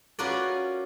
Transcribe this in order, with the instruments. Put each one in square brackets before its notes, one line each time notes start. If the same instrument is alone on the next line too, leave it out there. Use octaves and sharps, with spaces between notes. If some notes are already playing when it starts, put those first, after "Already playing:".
[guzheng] C#4 F4 F#4 A#4 B4 D5